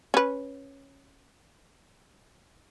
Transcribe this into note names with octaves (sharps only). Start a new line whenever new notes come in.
C#4 B4